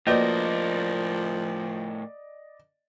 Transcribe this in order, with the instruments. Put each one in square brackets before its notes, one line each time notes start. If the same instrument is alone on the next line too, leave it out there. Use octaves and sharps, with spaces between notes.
[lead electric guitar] A2 A#4 [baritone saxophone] F3 [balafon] A#3 F#4 B4 [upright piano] D5 D#5